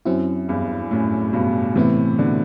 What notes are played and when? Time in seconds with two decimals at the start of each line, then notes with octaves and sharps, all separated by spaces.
0.05 F#2 F#3 C4 E4
0.48 E2 G2
0.91 F#2 A2
1.33 G2 B2
1.76 A2 C3 E3 B3 E4
2.18 B2 D3